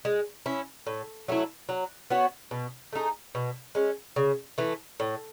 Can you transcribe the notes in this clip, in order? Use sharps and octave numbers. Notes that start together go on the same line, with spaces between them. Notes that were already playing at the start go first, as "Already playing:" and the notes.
G#3
C#4 E4
A2
F#3 A3 E4
F#3
B3 F#4 C#5
B2
A3 D#4 G#4
B2
G#3 C#4
C#3
E3 A3
A2